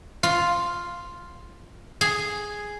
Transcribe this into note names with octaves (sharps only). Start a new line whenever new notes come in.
F4
G#4